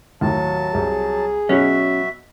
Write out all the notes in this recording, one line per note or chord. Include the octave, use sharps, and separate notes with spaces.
D#2 A2 F#3 A5
C2 G#4
B2 F#3 C#4 F#4 E5